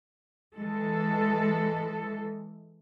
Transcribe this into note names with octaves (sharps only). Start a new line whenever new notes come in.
E3 G#3 A4